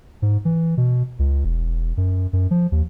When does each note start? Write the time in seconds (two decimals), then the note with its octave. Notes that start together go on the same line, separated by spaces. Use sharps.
0.22 G#2
0.45 E3
0.77 B2
1.19 C#2
1.44 E1
1.97 F#2
2.33 F#2
2.51 F3
2.72 D#2